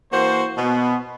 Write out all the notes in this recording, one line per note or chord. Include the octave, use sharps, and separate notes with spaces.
E3 A#3 F#4 C5
B2 B3